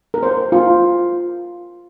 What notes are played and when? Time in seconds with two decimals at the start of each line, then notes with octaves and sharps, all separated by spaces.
0.14 A#4
0.23 C5
0.52 F4